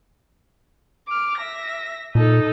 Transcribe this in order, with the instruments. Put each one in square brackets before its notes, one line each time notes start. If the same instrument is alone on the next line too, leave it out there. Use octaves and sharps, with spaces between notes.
[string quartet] D6 F6
E5 A#6
[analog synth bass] A#2 [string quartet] D#4 A4 D#5